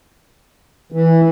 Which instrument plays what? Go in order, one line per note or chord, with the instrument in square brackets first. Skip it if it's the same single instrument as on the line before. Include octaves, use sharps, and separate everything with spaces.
[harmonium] E3